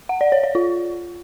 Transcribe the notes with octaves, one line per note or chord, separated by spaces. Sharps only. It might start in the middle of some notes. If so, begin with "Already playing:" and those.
F#5
D5
C#5
D5
F4